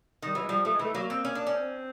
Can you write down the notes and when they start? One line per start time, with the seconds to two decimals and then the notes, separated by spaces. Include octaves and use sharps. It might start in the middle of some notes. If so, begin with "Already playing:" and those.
0.22 D#3 G3
0.35 E3 F#3
0.43 G#3
0.49 F3 G3
0.65 F3 A3
0.74 G#3
0.79 E3 A3
0.94 F#3 A#3
1.10 C4
1.25 C#4
1.35 D4
1.47 C#4
1.55 C4